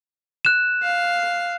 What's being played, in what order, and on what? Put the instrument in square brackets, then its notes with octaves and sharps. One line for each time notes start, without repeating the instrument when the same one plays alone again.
[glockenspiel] F#6 E7
[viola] F5